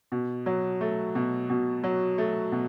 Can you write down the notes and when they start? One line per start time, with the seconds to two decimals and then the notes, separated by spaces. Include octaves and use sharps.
0.12 B2
0.46 F#3
0.81 A3
1.15 B2
1.50 B2
1.84 F#3
2.18 A3
2.52 B2